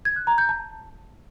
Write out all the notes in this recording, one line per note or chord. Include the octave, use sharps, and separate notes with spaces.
G#6
F#6
A#5
G6
A5